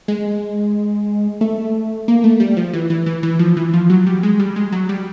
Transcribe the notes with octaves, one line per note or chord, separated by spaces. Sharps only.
G#3
A3
A#3
A3
G3
F3
E3
E3
E3
E3
F3
E3
F3
F#3
G3
G#3
G3
G#3
F#3
G3